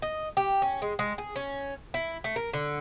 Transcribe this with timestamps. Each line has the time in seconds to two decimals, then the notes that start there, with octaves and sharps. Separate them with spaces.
0.02 D#5
0.37 G4
0.62 C#4
0.82 G#3
0.99 G#3
1.18 G#4
1.36 C#4
1.94 E4
2.24 A3
2.36 A#4
2.53 D3